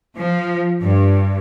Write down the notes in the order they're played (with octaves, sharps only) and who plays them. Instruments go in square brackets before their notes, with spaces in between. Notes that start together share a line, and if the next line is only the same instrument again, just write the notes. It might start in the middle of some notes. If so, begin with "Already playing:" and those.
[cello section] F3
G2